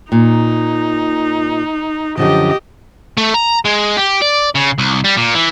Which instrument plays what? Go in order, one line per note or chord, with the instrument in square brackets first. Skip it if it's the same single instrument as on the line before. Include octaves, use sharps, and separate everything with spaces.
[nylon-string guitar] A#2 [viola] D#4
[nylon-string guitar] F#2 D3 F3 [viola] G4 D#5
[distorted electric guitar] A3
A#5
G#3
G4
D5
C#3
C2
G3
A#2
E3